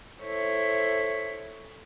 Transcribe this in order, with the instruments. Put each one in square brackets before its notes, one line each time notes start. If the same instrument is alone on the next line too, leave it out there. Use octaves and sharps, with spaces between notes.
[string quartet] E4 A4 C5 C#5